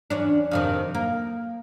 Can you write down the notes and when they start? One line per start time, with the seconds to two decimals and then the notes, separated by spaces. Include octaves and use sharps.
0.10 E2 C#4 D4
0.51 F2 C3 D#3
0.95 A#3